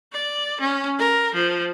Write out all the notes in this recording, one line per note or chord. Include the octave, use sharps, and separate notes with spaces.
D5
C#4
A#4
F3